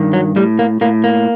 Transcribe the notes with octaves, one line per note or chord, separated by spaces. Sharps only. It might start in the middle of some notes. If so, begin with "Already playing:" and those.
Already playing: G2 D#3
F#3
A2 G3
A#3
A2 A#3
A#3